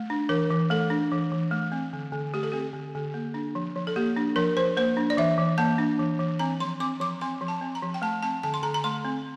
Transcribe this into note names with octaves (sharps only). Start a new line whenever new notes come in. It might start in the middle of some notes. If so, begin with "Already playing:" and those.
Already playing: A3
D4
E3 A#4
E3
A3 A4
D4
E3
E3
A3
C4
D3
D3
A3 G4
A4
C4 G4
D3
D3
A#3
D4
F3
F3
A4
A#3 G4
D4
F3 A#4
F3 C5
A#3 C5
D4
D5
E3 E5
E3
A#3 A5
D4
E3
E3
C4 A#5
F3 C6
C4 D6
F3 D6
C4 C6
F3
A5
C4
A#5
F3
G5
A3 A5
C4 A5
D3 A5
C6
D3 A#5
A#5
A3 C6
C4